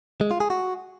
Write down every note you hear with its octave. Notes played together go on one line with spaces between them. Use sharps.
G#3
F4
G#4
F#4